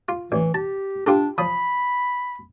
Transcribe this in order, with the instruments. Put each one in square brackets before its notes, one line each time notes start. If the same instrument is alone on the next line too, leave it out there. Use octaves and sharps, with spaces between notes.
[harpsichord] F4
[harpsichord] A1 [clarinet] E3
[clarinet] G4 [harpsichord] A5
[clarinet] D4 [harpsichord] F4 G4 A4
[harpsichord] F3 D#6 [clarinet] B5